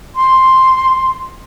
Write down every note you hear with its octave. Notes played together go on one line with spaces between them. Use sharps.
C6